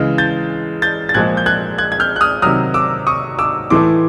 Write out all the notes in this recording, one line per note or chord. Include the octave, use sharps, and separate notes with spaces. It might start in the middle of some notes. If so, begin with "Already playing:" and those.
Already playing: C#3 E3 G#3
G6 A6
G6 A6
A6
A#2 F3 G#3 F#6 G#6
G6
F#6 G#6
F#6 G#6
G#6
F6 G6
F#6
D#6 F6
C3 D#3 F#3 D#6 F6
D6 E6
C#6 D#6
D6 E6
A2 E3 A3 C6 D6